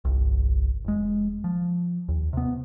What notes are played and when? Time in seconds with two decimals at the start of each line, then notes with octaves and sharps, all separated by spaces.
0.05 G1 C2
0.85 F1 G#3
1.44 F3
2.09 D#2
2.33 C3 B3